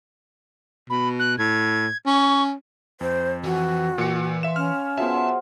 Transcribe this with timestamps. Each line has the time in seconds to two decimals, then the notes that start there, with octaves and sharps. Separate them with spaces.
0.90 B2 B5
1.19 F#6
1.38 A2 G#6
2.06 C#4 C#6
3.01 F2 C5
3.44 E3 F#4 G5 G#5
3.98 A#2 E3 C#7
4.43 E5 F5 C6 E7
4.56 C#4 F6
4.98 F#3 B3 F4 G#4 C5 E5 A5